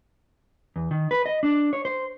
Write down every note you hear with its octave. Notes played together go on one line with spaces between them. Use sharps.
E2
D#3
B4
D#5
D4
C#5
C5